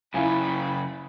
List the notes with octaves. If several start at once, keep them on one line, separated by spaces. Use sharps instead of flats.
F#2 C#3 E4 F5 G#5 B5